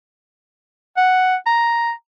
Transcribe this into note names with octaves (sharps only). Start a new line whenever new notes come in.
F#5
A#5